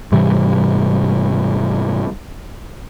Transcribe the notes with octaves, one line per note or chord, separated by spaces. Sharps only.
G#2 C3 E3 G3